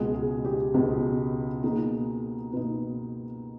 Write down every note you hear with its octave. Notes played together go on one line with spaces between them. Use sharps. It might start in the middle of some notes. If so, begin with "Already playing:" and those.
Already playing: C#2 B2 G#3 B3 G#4
G#4
G4
C#2 B2 G#3 B3
B2 A#3 D#4 G#4
B2 A#3 D#4 B4